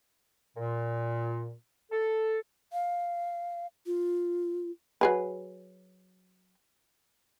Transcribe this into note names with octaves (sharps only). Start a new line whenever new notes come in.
A#2
A4
F5
F4
F#3 G#4 B4